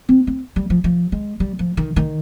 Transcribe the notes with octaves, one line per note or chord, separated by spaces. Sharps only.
C4
C4
G3
F3
F3
G#3
G3
F3
D#3
D#3